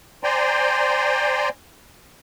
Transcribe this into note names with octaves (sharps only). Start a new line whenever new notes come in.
C5 D5 G5 G#5 A#5 C6